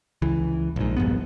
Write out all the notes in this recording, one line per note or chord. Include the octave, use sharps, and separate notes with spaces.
C#2 E3
A#1 G#2
E1 A#1 G2 B3